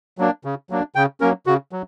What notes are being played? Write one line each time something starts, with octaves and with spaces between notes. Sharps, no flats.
F#3 A#3 D4
C#3
F#3 A#3 D4
C#3 G5
F#3 A#3 C#4 A#4
C#3 F#4
F#3